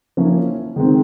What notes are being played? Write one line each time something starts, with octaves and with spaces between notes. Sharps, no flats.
F3 A#3 C#4 E4
D#3 G#3 C4